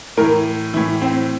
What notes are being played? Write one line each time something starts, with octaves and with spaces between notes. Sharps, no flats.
A2 E3 A#4
A2 E3 E4
C4